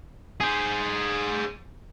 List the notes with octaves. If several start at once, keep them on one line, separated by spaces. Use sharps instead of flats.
G#4 C5